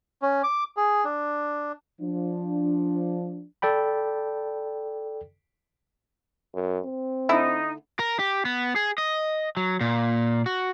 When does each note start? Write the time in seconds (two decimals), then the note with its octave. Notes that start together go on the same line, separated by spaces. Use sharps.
0.22 C#4
0.44 D6
0.77 G#4
1.04 D4
2.01 F3 D4
3.62 A4 D5 G5 B5
6.55 F#2
6.86 C4
7.29 D3 A3 D#4 E4
7.99 A#4
8.19 G4
8.45 B3
8.76 G#4
8.98 D#5
9.57 F#3
9.81 A#2
10.46 F#4